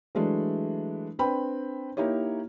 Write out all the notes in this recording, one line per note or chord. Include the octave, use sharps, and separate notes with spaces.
E3 F#3 G#3 A3 D4
C4 D4 B4 G5 B5
A#3 D#4 E4 G4 C#5